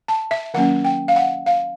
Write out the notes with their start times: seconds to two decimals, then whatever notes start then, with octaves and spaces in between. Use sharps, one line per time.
0.08 A5
0.31 E5
0.54 D#3 F#3 A#3 C#4 F#5
0.85 G5
1.08 F5
1.16 F#5
1.46 F5